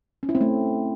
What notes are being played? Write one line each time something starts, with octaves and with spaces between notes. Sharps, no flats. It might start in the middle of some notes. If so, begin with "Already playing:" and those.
C#4
E4
C4
A3